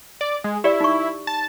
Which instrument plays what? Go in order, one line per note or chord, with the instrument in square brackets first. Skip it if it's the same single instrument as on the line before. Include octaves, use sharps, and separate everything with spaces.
[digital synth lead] D5
G#3
[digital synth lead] E4 [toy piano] G4 D5
[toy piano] D#4 C#6
[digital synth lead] A5